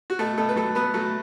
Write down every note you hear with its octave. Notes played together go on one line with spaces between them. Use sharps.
F#4
B2 A3 A4
B2 A3 A4
B4
F#3 A3 A4
F#3 B3 B4
F#3 A3 A4